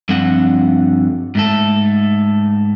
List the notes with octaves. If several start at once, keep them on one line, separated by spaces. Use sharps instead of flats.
G2 D3 F3 C4 F#5
G#2 A3 A4